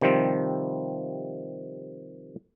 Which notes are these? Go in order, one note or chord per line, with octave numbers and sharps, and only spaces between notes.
C3 D#3 F3 G3 C4